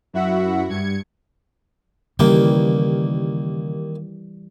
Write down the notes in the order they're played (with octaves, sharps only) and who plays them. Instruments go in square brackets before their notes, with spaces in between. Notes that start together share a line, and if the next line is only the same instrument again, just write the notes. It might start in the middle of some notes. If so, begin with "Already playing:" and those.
[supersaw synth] F#2 E4 F#4 E5 F#5
G2 G#6 C#7
[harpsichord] D#2 A#3 G5 [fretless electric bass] C#3 [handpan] E3 G3